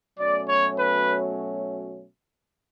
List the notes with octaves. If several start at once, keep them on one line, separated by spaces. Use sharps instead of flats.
B2 F#3 A3 C#4 D5
C#5
B4